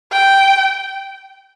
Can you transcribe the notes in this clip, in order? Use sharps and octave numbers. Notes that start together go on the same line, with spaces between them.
G5